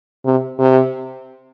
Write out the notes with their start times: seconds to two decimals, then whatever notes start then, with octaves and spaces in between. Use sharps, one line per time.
0.26 C3
0.59 C3